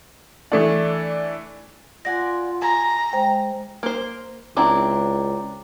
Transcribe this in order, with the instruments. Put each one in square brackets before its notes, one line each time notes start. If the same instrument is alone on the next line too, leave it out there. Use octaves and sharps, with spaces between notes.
[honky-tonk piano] E3 A3 D4
[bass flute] F4 [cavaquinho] D5 F#5 G#5 [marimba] A#6
[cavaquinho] G#5 [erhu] A#5
[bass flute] G#3 [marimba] C5 G5
[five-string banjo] A#3 C5
[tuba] C#2 [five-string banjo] C4 D4 E4 [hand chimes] G5 A#5 D6